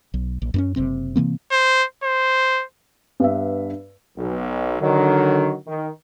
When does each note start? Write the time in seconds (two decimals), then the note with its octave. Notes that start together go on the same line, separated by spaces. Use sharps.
0.14 B1
0.42 A#1
0.54 F#2 B3 C#4
0.76 F#1 C3 C4
1.16 C3 E3 A#3 C4
1.51 C5
2.04 C5
3.20 G2 B3 E5
4.17 B1
4.81 D3 D#3 F#3
5.67 D#3